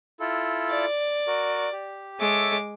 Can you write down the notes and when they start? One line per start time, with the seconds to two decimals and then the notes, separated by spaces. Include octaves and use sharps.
0.20 E4 F4 A4
0.71 D5
1.27 F#4 A#4
1.72 G4
2.20 G#3 A4 C#5 E5 D6